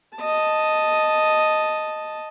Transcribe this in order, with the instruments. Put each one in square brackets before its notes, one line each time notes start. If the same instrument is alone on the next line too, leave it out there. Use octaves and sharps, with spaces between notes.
[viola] D#5 A5